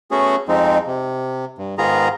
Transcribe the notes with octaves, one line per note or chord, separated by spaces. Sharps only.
A3 B3 C#4 F#4 G#4
F2 F3 G#3 C4 D#4
C3
G2
G#2 D#3 B3 F4 G#4 A#5